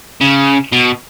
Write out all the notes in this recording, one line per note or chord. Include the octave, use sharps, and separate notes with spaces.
C#3
B2